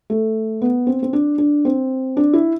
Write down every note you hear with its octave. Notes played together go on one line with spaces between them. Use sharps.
A3
B3
C4
C4
D4
D4
C4
D4
E4